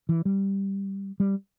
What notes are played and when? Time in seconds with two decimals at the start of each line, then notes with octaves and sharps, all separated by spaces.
0.09 E3
0.25 G3
1.20 G3